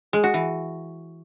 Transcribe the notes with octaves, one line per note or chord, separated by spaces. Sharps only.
G#3
F#4
E3